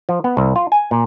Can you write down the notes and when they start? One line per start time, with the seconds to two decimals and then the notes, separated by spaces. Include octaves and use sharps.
0.09 F3
0.24 B3
0.37 C2
0.56 F4
0.72 G#5
0.91 A#2